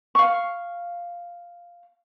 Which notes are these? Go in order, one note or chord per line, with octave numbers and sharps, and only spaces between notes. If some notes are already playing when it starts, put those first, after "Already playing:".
F5 C#6